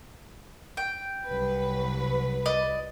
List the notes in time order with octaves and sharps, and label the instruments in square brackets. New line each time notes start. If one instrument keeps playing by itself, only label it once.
[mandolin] G5
[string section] C2 F#3 B4
[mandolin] D5 D#5